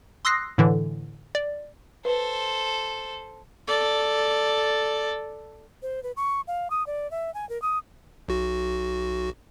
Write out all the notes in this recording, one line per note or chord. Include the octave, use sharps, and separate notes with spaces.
C6 D#6 E6 F#6 A#6 C7
A2 D3 E3
D5
A4 B4 C5
A4 D5
C5
B4
C#6
F5
D#6
D5
E5
G#5
A#4
D#6
B1 F#4